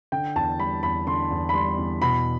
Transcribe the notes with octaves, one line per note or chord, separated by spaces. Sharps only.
D3 G5
E2 A5
G3 B5
E2 B5
D3 C6
E2
B5
G3 C6
E2
B2 B5